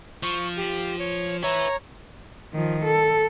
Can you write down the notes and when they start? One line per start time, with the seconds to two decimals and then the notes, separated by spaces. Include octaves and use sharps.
0.23 F3 C#6
0.57 G4
0.99 C#5
1.43 B4 C#5 E5 A#5
2.53 D#3 F3
2.84 A4